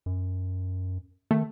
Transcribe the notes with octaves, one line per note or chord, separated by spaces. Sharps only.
F#2
D#3 A3